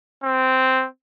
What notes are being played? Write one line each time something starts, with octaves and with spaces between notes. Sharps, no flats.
C4